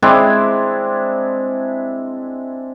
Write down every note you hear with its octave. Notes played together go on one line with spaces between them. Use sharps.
G#3 C4 D4 E4